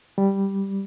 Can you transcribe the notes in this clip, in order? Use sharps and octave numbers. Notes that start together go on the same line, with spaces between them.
G3